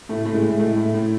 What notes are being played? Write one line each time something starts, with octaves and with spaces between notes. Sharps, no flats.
A2 A3
A2 A3
G#3
A2
A2 A3
A2
A2